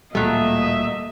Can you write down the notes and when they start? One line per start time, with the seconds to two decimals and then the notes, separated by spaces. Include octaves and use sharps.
0.15 D1 A#2 F#3 G3 A3 A#3 D#5 E5